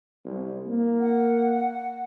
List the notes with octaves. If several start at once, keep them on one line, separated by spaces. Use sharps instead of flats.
C2
A#3
F#5